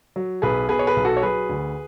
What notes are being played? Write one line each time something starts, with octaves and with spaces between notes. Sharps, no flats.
F#3
B1 G#4 B4
B2 G#4 B4
C#5
G#4 B4
B1
F#4 A4
C#5
F#3 G#4 B4
D2